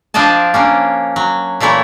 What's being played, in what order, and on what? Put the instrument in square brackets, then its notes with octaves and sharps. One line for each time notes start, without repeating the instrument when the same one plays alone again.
[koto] F3 C4 D4 D5 D#5 A5
A#3 C#4 D4
F#3
A#2 E3 A3 E4 C#5